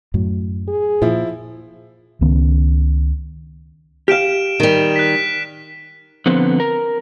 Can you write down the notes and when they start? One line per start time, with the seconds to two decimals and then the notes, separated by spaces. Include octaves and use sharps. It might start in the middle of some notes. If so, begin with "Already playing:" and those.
0.14 F#2 A2 F#3
0.68 G#4
1.02 A#2 F3 E4
2.21 C#2 D#3 B3 C#4
4.08 G4 F5 F6 D7 E7
4.60 D#3 G3
4.96 F#6 B6
6.26 D3 F3 B3 C4
6.60 A#4